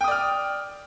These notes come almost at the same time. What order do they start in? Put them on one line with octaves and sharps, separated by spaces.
G5 D#6 D5 F6